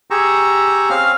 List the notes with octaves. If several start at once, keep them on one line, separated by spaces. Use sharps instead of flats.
G4 G#4 A#5 C#6 E6
C4 C#4 F5 F6